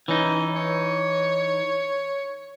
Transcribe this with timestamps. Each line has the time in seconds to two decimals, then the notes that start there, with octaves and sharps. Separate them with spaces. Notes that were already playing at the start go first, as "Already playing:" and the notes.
0.08 E3 C#4 D#4
0.56 C#5